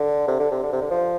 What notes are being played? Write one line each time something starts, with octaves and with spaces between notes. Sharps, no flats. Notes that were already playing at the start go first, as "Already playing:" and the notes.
Already playing: D3
C3
D3
C3
D3
C3
D3
F3